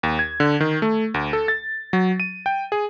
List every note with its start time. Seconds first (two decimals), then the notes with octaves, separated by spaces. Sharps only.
0.03 D#2
0.19 G#6
0.40 D3
0.60 D#3
0.82 A3
1.14 D2
1.33 A4
1.48 A6
1.93 F#3
2.20 D#7
2.46 G5
2.72 G#4